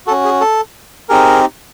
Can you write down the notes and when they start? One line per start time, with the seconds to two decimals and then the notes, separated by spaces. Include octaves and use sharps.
0.07 F#4 A4
0.11 C#4
0.25 G#4
0.41 A4
1.09 C4 D#4 G4 G#4 A#4